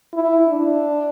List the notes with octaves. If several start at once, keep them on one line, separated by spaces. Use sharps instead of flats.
E4
D4